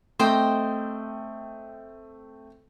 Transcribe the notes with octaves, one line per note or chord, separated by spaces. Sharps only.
A3 C4 C5 D#5 G5